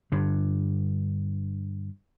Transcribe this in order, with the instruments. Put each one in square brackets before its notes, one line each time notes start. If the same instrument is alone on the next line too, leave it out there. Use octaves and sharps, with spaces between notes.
[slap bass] G2 D3